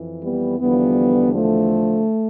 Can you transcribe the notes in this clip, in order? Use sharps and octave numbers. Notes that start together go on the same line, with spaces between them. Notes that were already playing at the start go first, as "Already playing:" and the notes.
Already playing: F2 E3
G3 B3
E2 D3 F3 G3 B3
F3 A3